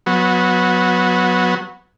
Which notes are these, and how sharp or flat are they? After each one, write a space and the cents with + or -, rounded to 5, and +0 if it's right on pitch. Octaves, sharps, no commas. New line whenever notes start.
F#3 -20 B3 +0